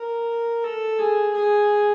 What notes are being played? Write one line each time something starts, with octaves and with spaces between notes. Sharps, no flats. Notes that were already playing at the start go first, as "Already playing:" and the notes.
Already playing: A#4
A4
G#4
G#4